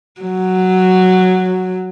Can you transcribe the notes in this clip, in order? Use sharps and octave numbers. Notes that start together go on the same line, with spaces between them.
F#3